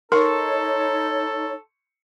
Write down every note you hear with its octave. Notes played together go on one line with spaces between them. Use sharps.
D#4 A4 A#4 C#5 C6 C#6